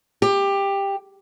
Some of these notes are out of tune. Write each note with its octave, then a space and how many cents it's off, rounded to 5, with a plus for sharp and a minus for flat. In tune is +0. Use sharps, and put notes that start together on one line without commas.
G4 +15